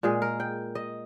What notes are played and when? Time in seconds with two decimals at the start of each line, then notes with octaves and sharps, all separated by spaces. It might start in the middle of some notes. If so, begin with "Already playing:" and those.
0.03 A#2 G#3 G#4
0.22 A#4
0.40 G5
0.75 D#5